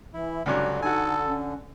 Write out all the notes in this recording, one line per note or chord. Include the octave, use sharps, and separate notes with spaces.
E3 E4
C#2 G2 D3 F#3 D5
D#4 F#4 A4 G#5
C#4